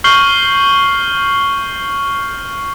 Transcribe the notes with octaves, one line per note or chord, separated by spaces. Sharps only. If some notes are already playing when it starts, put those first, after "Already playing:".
C#6 F6 G6 C7 F#7 G7